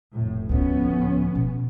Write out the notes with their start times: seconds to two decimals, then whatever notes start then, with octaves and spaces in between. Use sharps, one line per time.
0.15 F1 A2
0.49 D2 A2 F3 B3 C#4
1.35 B2